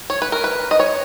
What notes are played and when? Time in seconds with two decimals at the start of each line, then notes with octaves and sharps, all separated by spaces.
0.10 C#5
0.22 B4
0.32 A#4
0.44 B4
0.71 D#5
0.80 C#5